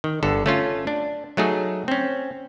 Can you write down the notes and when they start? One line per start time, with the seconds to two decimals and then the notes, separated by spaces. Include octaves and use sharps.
0.04 D#3
0.23 G1 D3 A4
0.46 A3 C#4 F4
0.87 D4
1.37 F#3 A3 D#4 G#4
1.88 C4 C#4